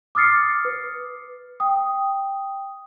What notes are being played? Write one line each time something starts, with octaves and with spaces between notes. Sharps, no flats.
D6 D#6 F6 A6 C7 C#7
B4
G5 D#6